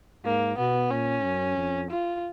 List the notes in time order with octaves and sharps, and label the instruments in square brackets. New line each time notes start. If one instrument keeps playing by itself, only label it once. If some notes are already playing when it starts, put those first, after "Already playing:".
[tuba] G#2 [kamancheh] A#3
[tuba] B2 [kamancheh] B3
[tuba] A#2 [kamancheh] C#4
[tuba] F#2
F2
[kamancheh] F4